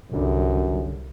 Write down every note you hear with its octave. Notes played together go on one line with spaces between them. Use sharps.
G1 C2 F#2 D3 G3